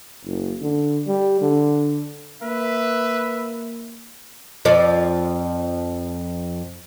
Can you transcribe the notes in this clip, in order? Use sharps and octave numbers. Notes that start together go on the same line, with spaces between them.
F#1
D3
G3
D3
A#3 B4 E5
F2 F3 D5